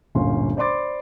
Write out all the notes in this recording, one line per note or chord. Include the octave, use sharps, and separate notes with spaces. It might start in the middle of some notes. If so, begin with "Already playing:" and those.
D1 G1 A#2 C#4 C6
C5 D5 B5 C6 D6 A6